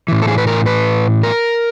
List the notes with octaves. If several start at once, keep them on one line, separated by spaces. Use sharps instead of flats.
A2 E3
A4
G#4
B4
A#4
B4
A#4